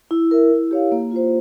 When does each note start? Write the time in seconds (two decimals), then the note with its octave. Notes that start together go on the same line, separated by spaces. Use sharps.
0.11 E4
0.31 A#4 E5
0.52 E4
0.71 G4 C#5 F5
0.92 A#3
1.11 F4 C5